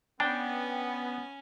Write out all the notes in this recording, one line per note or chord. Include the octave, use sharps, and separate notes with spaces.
B3 C#4 D4 G5